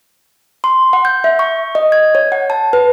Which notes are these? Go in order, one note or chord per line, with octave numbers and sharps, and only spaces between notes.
C6
F#5
G6
E5
C#6
D#5
G#6
C#5
F#5
A5
B4